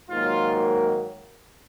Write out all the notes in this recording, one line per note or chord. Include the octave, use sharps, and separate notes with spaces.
G#2 D#3 F#3 A#3 F4